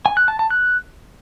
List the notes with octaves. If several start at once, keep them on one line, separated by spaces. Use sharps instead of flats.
G#5
F#6
A5
A5
F#6